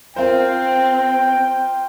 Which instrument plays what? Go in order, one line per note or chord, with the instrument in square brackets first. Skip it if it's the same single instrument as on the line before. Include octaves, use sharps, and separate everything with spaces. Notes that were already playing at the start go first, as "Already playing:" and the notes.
[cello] C4 [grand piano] F4 A#4 C5 [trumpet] G5